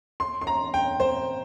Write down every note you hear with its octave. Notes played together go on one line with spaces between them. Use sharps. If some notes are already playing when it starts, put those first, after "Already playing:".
C6
C6
A#5
G5
C5